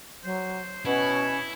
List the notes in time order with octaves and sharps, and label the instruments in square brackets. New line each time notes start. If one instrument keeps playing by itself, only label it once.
[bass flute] F#3 [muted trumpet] C5
[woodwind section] B2 [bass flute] C#4 [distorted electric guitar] E4 [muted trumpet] C#5